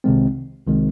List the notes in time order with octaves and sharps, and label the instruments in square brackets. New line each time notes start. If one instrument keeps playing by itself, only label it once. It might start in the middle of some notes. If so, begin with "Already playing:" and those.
[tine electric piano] C2 C3 D#3 G#3 C4
C2 C3 D#3 G#3 C4